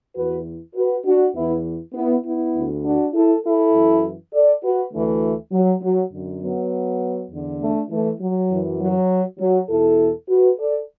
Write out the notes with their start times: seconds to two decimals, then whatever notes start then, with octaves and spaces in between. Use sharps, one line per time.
0.16 E2 E3 F#4 B4
0.75 F#4 B4
1.05 D4 F#4
1.35 E2 E3 B3 E4
1.94 B3 E4
2.24 B3 E4
2.54 D2 D3
2.84 D4 F#4
3.13 E4 A4
3.44 E4 A4
3.73 F#2 E3
4.33 A4 D5
4.62 F#4 B4
4.93 D2 D3 E3 A3
5.52 F#3
5.81 F#3
6.12 F#2 D3
6.41 F#3 B3
7.30 E2 D3
7.60 A3 D4
7.90 E3 A3
8.20 F#3
8.50 F#2 E3
8.80 F#3
9.39 F#3
9.69 E2 B2 E4 A4
10.28 F#4 B4
10.58 A4 D5